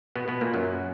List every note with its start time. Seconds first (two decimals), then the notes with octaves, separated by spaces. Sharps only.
0.16 B2 B3
0.28 B2 B3
0.41 A#2 A#3
0.54 F#2 F#3